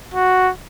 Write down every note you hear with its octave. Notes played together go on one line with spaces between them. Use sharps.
F#4